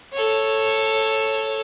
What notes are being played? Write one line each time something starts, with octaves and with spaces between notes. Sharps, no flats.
A4 C#5